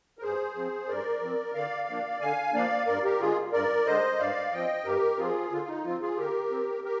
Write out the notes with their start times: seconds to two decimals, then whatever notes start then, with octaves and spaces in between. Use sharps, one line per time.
0.19 A#4
0.23 G2 G#4 C5
0.55 F3 C4
0.88 G2 A#4 D5
1.22 F3 C4
1.54 D3 D5 F5
1.88 F3 A#3 D4
2.21 D3 F5 G#5
2.53 F3 A#3 D4 D5 F5
2.87 G2 A#4 D5
3.04 G4 A#4
3.20 D3 G#3 F4 G#4
3.53 G2 A#4 D5
3.86 D3 G#3 C5 D#5
4.19 G2 D5 F5
4.52 F3 C4 D#5 G5
4.85 G2 G4 A#4
5.18 F3 C4 F4 G#4
5.52 D3 F4
5.68 D#4
5.84 F3 C4 F4
6.01 F4 G#4
6.17 D3 G4 A#4
6.50 F3 C4
6.84 G4 A#4